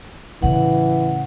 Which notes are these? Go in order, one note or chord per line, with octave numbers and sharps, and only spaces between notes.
A2 C#3 E3 F#5